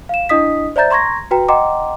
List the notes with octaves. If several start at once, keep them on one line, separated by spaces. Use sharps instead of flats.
F5 E7
D4 E4 D#5 D#6 B6
C5 D5 E5 A#5 G6 A6
A#5 C6 C#6 G#6 A#6
F#4 B4 G5 A#5
D#5 F#5 G5 A#5 C6 D6